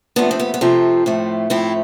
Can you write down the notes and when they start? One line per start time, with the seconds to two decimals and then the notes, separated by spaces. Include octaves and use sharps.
0.16 F2 C3 F3 A3 B3 D4
0.31 C4
0.40 B3
0.54 B3
0.61 F2 C3 F3 A3 C4
1.06 A2 F3 A3
1.50 A2 F3 A3 C4 E4